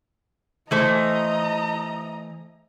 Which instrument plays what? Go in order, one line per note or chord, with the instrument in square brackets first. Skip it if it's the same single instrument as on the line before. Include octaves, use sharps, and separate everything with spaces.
[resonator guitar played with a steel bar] E3 A3 C5 [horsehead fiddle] D#5 A#5